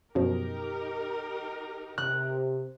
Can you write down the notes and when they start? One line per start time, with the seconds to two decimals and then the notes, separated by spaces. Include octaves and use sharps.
0.15 F#2 B2 F3 D#4 G4 A#4
1.98 C3 F#6